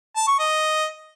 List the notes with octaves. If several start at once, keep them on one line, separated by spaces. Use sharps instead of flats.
A5
C#6
D#5